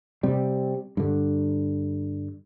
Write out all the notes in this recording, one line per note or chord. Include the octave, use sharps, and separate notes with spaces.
C3 G3
G2 D3